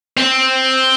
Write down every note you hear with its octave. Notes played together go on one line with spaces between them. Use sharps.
C4